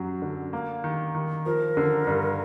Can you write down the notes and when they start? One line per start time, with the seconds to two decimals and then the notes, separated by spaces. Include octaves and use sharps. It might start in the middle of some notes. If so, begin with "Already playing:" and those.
Already playing: F#2 F#3
0.22 D3
0.53 A#3
0.84 D#3
1.15 D#3
1.46 F3 A#4
1.77 D3
2.07 G2